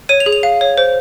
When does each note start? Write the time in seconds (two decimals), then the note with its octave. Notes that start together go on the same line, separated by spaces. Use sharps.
0.09 C#5 D#7
0.20 F7
0.26 G#4
0.33 F7
0.43 F5
0.61 C#5
0.78 C5